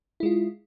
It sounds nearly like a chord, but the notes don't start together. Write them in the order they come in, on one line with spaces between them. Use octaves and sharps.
E4 G#3 F4